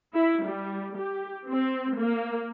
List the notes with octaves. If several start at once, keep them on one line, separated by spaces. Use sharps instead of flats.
E4
G3
G4
C4
A#3